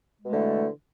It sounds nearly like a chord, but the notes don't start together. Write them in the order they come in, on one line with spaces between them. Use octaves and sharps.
G#3 B2 A3 D3 E3